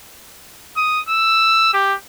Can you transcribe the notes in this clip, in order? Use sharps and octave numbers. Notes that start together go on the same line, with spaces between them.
D#6
E6
G4